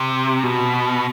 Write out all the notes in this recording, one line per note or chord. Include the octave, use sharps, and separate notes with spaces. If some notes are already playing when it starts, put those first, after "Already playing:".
Already playing: C3
B2